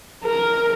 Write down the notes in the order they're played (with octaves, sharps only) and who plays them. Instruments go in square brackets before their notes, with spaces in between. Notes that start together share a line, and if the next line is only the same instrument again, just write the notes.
[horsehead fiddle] A#4